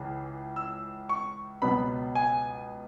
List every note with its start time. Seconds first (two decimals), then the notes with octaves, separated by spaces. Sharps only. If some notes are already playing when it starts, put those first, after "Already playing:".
Already playing: C#2 C#3 E3
0.56 E6
1.09 C#6
1.62 C#2 B2 F#3 B3 B5
2.15 G#5